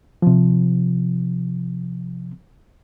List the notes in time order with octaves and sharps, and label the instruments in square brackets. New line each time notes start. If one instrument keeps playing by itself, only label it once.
[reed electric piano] C3 F3